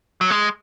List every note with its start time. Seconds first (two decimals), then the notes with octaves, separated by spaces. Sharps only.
0.21 F#3
0.30 G#3